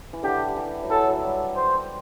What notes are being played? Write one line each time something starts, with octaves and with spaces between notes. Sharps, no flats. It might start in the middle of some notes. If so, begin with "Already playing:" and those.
E3
D3 G4
E3
F#3
E3 A4
F#3
G3
C5